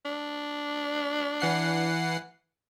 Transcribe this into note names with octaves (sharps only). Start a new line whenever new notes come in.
D4
E3 F#5 C7